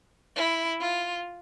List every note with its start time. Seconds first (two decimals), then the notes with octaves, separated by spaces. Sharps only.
0.36 E4
0.80 F4